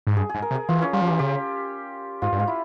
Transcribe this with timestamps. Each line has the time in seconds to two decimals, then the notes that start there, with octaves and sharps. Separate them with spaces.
0.07 G#2
0.17 G2 G#4
0.29 G#4
0.35 G#2
0.42 A#4
0.51 C3
0.55 G#4
0.69 E3 F4
0.82 C#4
0.93 G3 F4
1.01 F3
1.07 E3 G4
1.19 C#3 G4
2.22 G#2 F4
2.32 G2
2.39 G#2 F4
2.47 E4